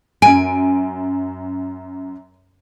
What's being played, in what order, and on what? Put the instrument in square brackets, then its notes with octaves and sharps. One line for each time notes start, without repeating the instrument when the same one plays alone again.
[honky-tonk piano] F#2 D7 [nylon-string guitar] G#5